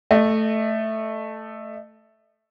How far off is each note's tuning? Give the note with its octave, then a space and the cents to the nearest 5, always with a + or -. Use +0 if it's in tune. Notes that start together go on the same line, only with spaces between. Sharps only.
A3 +0 D#5 -30